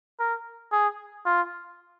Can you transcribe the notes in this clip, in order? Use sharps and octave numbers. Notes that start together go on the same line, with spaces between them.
A#4
G#4
F4